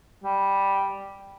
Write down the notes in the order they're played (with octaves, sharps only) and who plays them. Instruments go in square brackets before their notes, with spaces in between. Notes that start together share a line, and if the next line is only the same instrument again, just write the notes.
[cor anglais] G3